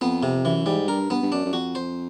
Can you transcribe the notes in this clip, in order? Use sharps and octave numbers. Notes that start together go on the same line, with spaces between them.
F2 B3
C3
F#2 E3
G#2 G3
G2 A#4
G2 B3
G2
F#2 D4
F#2
F2 F#4
C5